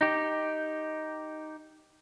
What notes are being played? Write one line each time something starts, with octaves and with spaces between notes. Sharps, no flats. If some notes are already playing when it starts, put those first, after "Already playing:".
D#4 G4